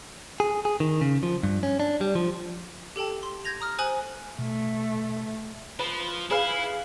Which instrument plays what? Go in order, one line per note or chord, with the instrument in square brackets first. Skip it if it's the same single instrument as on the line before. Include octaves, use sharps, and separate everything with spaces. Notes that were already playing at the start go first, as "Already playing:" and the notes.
[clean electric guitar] G#4
G#4
D#3
C#3
F3
G2
C#4
D4
G3
F3
[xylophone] G4 A4 G5 A5
C6
G6 G#6 A#6 F7
A#5 D#6 F6
C5 G#5 D#6 F#6 F#7
[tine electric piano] B2 [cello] A3
[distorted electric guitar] F3 [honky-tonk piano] B4
[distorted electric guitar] E4 [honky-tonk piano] G#4 B4 F5